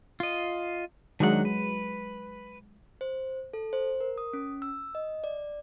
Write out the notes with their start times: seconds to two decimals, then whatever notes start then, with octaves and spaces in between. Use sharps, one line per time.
0.20 F4 D#5
1.20 D#3 F#3 G#3 D4 F#5
1.45 B4
3.01 C5
3.54 A4
3.73 C5
4.00 A#4
4.18 D#6
4.33 C#4
4.62 E6
4.95 D#5
5.24 D5